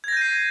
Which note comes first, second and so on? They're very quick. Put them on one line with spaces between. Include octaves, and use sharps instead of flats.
G#6 A#6 G6 D#7 C7